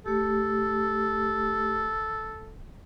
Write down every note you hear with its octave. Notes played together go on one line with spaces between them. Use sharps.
A3 G4 A4